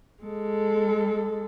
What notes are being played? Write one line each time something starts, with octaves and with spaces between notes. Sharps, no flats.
G#3 A4